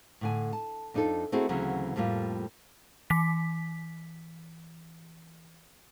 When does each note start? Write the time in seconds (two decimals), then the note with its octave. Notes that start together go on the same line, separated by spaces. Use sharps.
0.21 A2 D3 G#5
0.53 A5
0.94 F2 D4 D#4 F4 A4
1.32 A3 C4 D#4 E4 F#4 G#4
1.49 D2 C#3 E3 F#3 C4
1.96 F2 A2 G3 A#3 F4
3.10 E3 B6